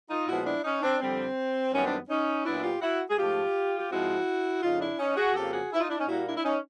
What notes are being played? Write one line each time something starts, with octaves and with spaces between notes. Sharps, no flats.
D#4 F4
A#2 F3 G#3 B3 E4 F#4
D4 E4
C#4 D#4
C4 D4
F2 D3 G3 C4
F#2 D#3 G3 B3 C#4
C4 D4
C#4 D#4
A#2 F#3 B3 D4 E4
F4 G4
E4 F#4
G#4
G#2 F3 A3 F4 G4
G4
G#2 F3 G#3 C4 E4 F#4
F2 C#3 F3 D#4 F4
D4 E4
C#4 D#4
F#4 G#4
F2 C#3 F3 A#3 G4 A4
F#4 G#4
E4
D#4 F4
D4 E4
C#4 D#4
A#2 G3 A#3 E4 F#4
D4 E4
E4
C#4 D#4